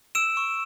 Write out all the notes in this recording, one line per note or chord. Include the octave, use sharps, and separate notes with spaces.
E6 D7 E7
C#6